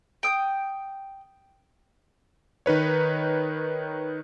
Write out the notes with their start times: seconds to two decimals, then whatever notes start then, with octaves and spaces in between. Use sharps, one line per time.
0.23 G5 D#6 G6
2.66 D#3 D#4 B4 C#5